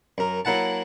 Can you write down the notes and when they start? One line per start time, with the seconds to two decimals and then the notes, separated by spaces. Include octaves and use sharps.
0.18 F#2 A#4
0.45 F#3 A#3 E4 F#5 A5